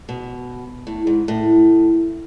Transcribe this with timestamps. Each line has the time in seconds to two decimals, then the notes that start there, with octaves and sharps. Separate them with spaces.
0.09 B2
0.87 A2
1.07 G#2
1.28 A2